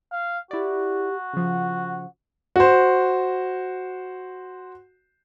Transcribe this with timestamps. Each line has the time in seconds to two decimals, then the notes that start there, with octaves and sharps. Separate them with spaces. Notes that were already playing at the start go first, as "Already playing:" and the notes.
0.12 F5
0.51 E4 F#4 G4 D5
1.33 C#3 F3 F#5
2.56 F#4 C5